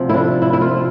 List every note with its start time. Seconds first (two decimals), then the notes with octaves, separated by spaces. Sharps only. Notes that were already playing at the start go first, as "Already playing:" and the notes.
Already playing: D2 C3 F3
0.09 E4
0.14 D4
0.42 E4
0.53 E4
0.61 F4